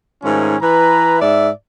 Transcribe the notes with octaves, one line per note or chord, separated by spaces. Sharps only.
G#2 D#3 F3 A3 C#4
E3 B4 A#5
G#2 D5 E5